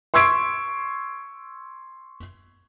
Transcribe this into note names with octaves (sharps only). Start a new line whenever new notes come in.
C6 C#6 E6 G#6 C7 D7